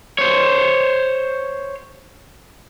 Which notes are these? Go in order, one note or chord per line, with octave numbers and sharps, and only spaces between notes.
C5 C#5